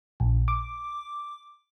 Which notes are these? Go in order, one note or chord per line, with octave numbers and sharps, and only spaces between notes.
A#1
D6